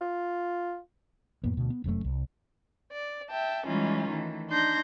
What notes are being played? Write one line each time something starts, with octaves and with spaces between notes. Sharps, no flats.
F4
F2 A2 A#3 B3
D2 B2
B3
F1 F#2 B2 A3
C2
D5
E5 G5 A5
E3 G3 G#3 C#4 D#4 F4
D#3 E3 A3
D4 D#4 C6 G6 A#6